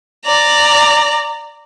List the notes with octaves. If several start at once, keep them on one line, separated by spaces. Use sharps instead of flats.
D5 A#5